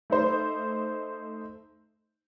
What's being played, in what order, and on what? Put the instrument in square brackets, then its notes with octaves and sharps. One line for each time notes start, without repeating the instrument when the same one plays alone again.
[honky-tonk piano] A3 D#4 C5